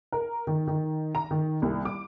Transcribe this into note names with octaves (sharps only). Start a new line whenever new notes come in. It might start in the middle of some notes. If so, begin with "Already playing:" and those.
A#4
D#3
D#3
A#5
D#3
C2
D6